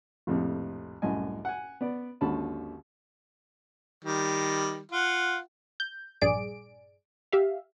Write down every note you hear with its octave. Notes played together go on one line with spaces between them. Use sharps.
A#1 F2 A2 C3
C2 F#2 A2 D#5 G#5
F#5 G#5
B3 D5
G#1 D#2 D3 C#4 A5 B5
D#3 G3
F4 F#5
G6
A#1 G2 G#4 D5 D7
G4 E5 F5